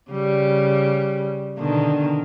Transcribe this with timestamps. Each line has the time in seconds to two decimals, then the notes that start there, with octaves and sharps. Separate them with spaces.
0.12 C#3 G3
1.59 B2 D3 D#3